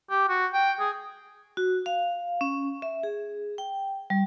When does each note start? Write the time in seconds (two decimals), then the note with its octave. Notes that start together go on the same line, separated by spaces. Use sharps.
0.10 G4
0.29 F#4
0.54 G5
0.80 G#4
1.57 F#4
1.86 F5
2.41 C#4
2.82 E5
3.03 G#4
3.58 G5
4.10 G3